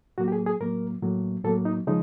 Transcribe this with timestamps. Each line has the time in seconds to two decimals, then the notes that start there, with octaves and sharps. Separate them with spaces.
0.18 A2 F#3 A#3 F#4
0.28 G4
0.32 G#4
0.46 G#4
0.61 A2 F#3 A#3 A#4
1.02 A2 F#3 A#3
1.44 A2 F#3 A#3 A4
1.65 D#4
1.87 C#3 F3 G#3 D#4